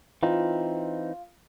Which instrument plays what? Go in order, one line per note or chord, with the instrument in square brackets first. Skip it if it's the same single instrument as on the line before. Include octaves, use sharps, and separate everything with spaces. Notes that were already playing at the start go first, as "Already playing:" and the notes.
[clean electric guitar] E3 C4 D#4 [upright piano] F4